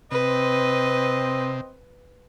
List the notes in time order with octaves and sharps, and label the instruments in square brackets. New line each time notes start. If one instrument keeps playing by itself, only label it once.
[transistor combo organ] C3 [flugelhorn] C4 [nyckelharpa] B4 [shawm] D#5